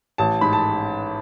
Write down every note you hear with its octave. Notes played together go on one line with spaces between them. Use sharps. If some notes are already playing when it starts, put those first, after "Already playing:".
A1 A5
G#2 B5
A5